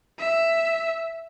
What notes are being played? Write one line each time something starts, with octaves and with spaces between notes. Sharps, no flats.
E5